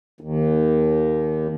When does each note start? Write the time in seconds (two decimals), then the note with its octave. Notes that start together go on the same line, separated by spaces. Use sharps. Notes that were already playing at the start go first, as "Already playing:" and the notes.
0.21 D#2